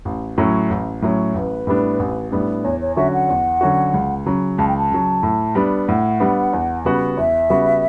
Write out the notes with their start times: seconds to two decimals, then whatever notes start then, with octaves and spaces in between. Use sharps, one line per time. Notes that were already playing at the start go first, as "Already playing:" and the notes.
0.05 A1
0.38 A2 F#3 C#4
0.70 A1
1.02 A2 F#3 C#4
1.34 A1 B4
1.67 A2 G3 B3 D4
1.99 A1
2.32 A2 G3 B3 D4
2.64 E2 C#5
2.81 C#5
2.96 D3 F#3 C#4 F#4 E5
3.13 F#5
3.29 E2
3.61 D3 F#3 C#4 F#4
3.94 C#2
4.26 C#3 F#3
4.58 C#2 A5
4.68 G5
4.77 A5
4.91 C#3 F#3
5.23 A2
5.55 G3 B3 D4
5.88 A2 F#5
6.20 G3 B3 D4
6.53 E2
6.85 C#3 G3 B3 F#4
7.17 E2 E5
7.50 C#3 G3 B3 F#4